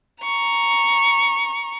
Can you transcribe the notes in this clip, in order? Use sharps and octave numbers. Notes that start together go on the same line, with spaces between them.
A#5 C#6